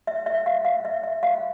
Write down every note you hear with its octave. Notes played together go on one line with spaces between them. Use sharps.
E5
E5
F5
F5
E5
E5
F5